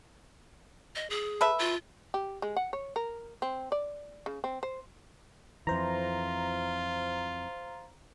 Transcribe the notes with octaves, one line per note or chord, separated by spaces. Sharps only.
D#5
G#4
A4 B4 E5
F4
G4
G#3
F#5
C#5
A#4
C4
D5
C#3
C4
C5
F2 E3 F4 C5 A#5